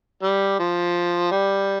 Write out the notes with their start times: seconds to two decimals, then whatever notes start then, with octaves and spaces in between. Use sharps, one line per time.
0.23 G3
0.60 F3
1.31 G3